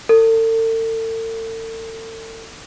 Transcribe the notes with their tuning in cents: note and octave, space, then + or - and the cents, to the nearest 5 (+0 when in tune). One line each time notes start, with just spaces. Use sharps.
A4 +40